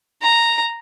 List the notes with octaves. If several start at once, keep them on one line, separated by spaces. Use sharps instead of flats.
A#5